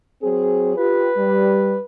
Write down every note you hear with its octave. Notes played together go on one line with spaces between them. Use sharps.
F#3 C4 G#4
F4 G4 B4
G3